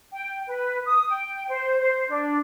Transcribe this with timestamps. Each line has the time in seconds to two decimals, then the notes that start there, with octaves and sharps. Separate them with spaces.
0.12 G5
0.47 B4
0.86 D#6
1.09 G5
1.49 C5
1.79 C5
2.09 D4